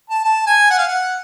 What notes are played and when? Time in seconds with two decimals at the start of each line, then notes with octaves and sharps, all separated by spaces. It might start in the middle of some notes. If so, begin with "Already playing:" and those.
0.10 A5
0.24 A5
0.47 G#5
0.71 F#5
0.78 F5
0.88 F#5